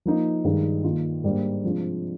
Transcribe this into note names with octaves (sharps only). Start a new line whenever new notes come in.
F3 A#3 D#4
G2 D#3 G#3 D#4
D#3 A#3 F4
G#2 G3 A#3 D4
C3 F3 G#3 D4